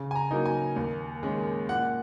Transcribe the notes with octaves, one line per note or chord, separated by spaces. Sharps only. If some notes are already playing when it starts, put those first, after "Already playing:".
Already playing: C#3
G#5
A#5
F#3 A#3 D#4
G#5
D#2
D#3 G#3 C#4
A#2 F#5